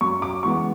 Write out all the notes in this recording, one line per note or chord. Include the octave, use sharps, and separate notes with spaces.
F#2 C#6
D6
C#3 E3 G#3 B3 C#6